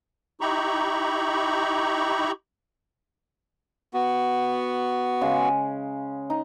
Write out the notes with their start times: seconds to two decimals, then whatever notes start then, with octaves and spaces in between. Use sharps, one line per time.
0.41 D#4 E4 G4 A#5 B5 C#6
3.93 B3 F#4
5.21 C#3 G#3
6.30 D#4